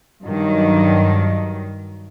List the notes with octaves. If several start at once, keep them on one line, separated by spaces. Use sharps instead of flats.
G2 D#3 F#3